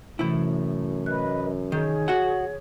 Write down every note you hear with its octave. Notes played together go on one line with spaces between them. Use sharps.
F#2 A2 C3 E3 E4
B4 D#5 F#6
D#3 G#4 C#5
F#4 F#5